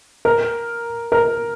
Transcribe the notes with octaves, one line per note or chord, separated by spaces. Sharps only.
A#4
A#4